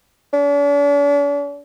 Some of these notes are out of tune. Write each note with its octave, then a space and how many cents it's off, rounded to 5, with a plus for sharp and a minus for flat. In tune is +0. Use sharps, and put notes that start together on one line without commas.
D4 -45